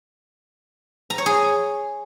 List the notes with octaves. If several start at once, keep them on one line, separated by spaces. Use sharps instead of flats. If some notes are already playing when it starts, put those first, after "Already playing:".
A#5
C#5
G#4